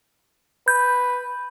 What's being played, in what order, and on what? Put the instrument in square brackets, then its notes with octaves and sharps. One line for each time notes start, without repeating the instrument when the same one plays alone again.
[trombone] B4 [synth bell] G6